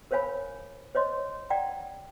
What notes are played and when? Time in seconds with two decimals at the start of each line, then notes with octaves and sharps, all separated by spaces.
0.11 A#4 C5 C#5 F5 G#5 B5
0.95 C5 C#5 D#5 C6
1.50 D5 F#5 G5 A#5